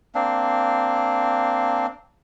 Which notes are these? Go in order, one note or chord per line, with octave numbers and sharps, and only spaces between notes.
A#3 C4 D4